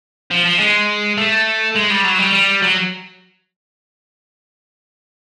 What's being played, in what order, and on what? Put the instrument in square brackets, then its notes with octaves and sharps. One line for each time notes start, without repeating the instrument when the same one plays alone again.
[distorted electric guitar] F3
F3
G#3
A3
G#3
G3
F#3
G3
G3
F#3